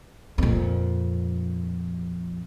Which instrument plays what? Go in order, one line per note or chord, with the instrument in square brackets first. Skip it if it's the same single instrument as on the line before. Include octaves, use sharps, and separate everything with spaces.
[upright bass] F2 A#2